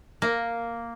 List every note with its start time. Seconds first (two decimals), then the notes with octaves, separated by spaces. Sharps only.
0.22 A#3